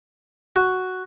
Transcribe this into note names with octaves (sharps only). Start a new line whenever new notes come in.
F#4